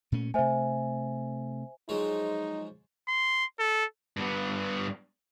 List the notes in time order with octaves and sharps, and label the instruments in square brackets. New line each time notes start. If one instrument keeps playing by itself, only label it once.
[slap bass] A#2 A3 C#4
[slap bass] C3 A3 [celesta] C5 E5 G#5
[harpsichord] F3 F#3 G#3 [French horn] D#4
[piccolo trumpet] C6
A4
[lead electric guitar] G2 B3